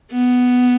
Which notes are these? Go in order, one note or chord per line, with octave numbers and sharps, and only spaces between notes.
B3